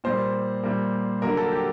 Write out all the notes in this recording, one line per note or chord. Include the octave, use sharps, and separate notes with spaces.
A#2 G3 A#3 C5
A#2 G3 A#3
D3 F#3 A#3 A#4
A4
G4